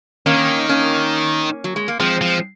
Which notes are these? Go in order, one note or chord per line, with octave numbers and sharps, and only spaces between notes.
D#3 A#3 C#4
A#3 C#4
F#3
G#3
A#3
F3 G#3 C4
F3